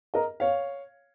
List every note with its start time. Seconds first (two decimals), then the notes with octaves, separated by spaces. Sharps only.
0.14 A#4 D#5
0.40 C#5 F5